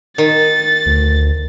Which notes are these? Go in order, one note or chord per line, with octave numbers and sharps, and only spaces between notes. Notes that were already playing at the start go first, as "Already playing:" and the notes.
D#3 A6
D2